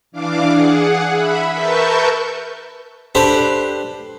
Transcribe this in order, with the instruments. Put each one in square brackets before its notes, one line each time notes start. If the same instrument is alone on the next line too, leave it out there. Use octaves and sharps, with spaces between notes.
[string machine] E3 D4 F5 D6
G#4 F#5
E5 B5
A#4 B4 E5 A5 C#6 G6
[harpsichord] D4 G4 A4 B4 C5